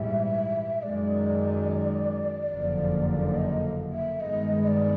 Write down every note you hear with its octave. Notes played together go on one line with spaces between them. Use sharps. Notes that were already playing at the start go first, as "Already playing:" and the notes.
Already playing: A#1 G#2 E3 G3 E5
F#2 D#3 G#3 D5
F#1 F2 D3 F3 A#3
D#5
E5
G2 D#3 G#3 B3 D#5
D#5
D5